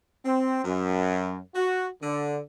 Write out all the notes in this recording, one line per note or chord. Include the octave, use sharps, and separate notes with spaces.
C4
F#2
F#4
D3